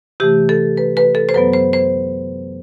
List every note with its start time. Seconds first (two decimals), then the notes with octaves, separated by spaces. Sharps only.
0.20 C3 E3 A3 G4
0.49 A4
0.77 B4
0.97 B4
1.15 A4
1.29 C5
1.34 F#2 F#3 B3 B4
1.53 C5
1.73 C5